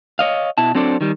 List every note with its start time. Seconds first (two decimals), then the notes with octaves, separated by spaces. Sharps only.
0.19 C#5 D#5 F5
0.58 B2 E4 A5
0.75 F#3 C4 D4 A4 C5 D5
1.01 D#3 G3